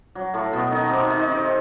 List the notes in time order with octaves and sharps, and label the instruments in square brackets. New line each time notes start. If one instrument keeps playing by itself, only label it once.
[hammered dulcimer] F#3
A2 A3
B2 B3
D#3 D#4
C3 C4
D#3 D#4
C3 C4